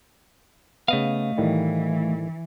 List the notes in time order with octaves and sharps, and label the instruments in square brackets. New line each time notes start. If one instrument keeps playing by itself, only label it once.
[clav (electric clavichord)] C#3 B3 [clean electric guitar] A3 D#5 F5
[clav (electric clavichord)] A2 D#3 G3 [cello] E3